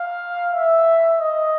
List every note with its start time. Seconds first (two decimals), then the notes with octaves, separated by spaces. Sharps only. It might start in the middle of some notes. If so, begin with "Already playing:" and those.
Already playing: F5
0.51 E5
1.20 D#5